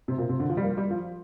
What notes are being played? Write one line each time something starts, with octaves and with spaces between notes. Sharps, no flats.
C3
A#2
C3
D3
F3
G3
A#3
G3
F3